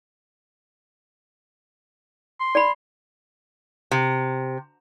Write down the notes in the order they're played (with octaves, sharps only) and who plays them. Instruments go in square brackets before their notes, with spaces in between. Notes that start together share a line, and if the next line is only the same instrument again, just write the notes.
[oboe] C6
[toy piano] D5 B5
[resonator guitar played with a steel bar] C3